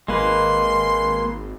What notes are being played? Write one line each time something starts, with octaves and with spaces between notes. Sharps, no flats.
G#1 G#3 A#3 B4 C6